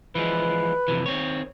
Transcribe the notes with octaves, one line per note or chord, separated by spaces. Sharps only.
E3 F3 G#3 B4
F2 C3 E3
D#3 C4 C#5